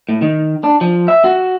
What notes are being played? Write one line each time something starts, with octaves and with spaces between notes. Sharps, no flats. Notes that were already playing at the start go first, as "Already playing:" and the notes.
A2
D#3
D4
F3
E5
F#4